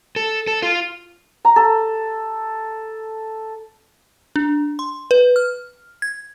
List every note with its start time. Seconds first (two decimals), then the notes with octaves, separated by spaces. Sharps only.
0.16 A4
0.47 A4
0.62 F4
1.45 A#5
1.56 A4
4.36 D4
4.79 C6
5.11 B4
5.36 F6
6.02 G#6